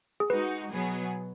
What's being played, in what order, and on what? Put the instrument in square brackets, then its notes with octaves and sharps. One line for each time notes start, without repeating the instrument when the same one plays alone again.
[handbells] G#4
[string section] G#3 D#4 F#4 [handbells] B4
[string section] B2 F#3 B3 G#4